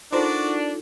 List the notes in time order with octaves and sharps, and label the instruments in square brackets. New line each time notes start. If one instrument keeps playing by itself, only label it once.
[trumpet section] D4 [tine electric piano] D#4 F4 A4 [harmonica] F#4 D5 [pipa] A#4 C5